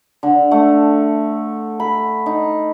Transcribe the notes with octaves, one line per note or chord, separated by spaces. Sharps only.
D3
A3
B5
D#4